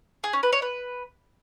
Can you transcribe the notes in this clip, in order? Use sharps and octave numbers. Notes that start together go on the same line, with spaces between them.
G#4
C#4
B4
C#5
B4